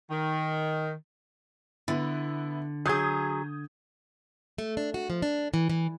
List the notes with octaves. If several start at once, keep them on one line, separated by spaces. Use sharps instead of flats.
D#3
D3 B3 E4
F#3 G#4 D#6 G6 G#6
A3
D4
F#4
F3
D4
E3
E3